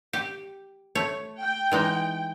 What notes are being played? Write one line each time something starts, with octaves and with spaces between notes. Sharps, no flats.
G4
A3 C#5
G5
E3 G#3 D#4